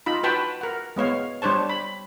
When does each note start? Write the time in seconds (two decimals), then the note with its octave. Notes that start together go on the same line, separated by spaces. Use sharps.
0.06 D#4 F4 B5
0.24 F#4 B4 G5 A5 B5
0.61 A#4 F#5
0.96 G#3 B3 C#5 F5
1.42 G3 D4 C5 C#5 A5
1.69 B5